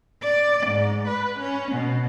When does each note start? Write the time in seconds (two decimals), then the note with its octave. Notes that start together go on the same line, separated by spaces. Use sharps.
0.23 D5
0.66 G#2
1.08 B4
1.39 C#4
1.72 B2